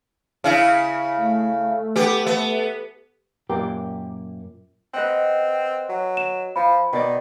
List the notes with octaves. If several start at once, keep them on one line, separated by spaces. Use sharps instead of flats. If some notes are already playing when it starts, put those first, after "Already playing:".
C#3 E4
A3
B3 G4
B3
F#2 A#2 A#3 G4 A#4
C4 B4 D#5 F#5
F#3
E7
F3 B5
B2 D#3 D5